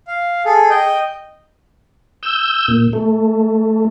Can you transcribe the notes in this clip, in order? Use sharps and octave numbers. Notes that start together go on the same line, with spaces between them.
F5
G#4 A4
D#5 G5
E6 G6
A#2
A3